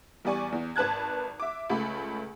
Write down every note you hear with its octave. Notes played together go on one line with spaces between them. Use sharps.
E2 G3 D5 G#5 C#6
E2
G#1 B4 A5 F#6 G#6
E5 D6
C#2 A3 B5